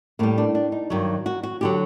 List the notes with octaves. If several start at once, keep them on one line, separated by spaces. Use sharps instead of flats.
A2 G3 A#3
D4
D4
D#4
G2 D#3 F#3
F#4
F#4
D3 F#3 G4